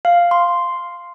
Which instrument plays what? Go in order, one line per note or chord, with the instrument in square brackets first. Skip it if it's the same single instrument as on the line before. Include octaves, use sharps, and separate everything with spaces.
[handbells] F5
C6